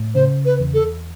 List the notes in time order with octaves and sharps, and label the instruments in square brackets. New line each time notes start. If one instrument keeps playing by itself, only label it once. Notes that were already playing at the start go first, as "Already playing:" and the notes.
Already playing: [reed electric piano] A2
[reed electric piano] C#3 [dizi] C5
[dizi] B4
[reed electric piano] E2
[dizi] A4